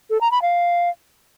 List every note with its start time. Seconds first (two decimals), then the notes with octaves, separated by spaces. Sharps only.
0.10 A4
0.21 A#5
0.31 B5
0.42 F5